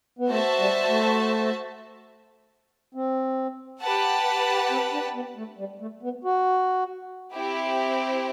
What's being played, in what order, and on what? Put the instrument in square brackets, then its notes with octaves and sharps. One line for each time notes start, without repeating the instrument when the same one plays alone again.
[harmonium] B3
[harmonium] A3 [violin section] F#4 C5 E5 A5
[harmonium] G3
A3
C4
[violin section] G4 B4 F#5 A5
[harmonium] C4
D4
B3
A3
G3
A3
B3
F#4
[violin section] C4 E4 G4